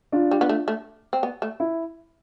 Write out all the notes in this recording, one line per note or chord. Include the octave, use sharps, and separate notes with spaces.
D4 F4
G3
B3
A3
A3
C4
B3
A3
E4